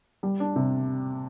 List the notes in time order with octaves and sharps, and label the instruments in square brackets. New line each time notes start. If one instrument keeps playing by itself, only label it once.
[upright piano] G3
D4
C3